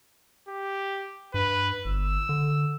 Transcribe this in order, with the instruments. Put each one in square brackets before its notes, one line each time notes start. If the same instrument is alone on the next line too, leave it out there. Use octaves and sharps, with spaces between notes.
[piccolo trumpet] G4
[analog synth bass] G2 [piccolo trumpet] B4
[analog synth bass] G1 [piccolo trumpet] E6
[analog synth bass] D3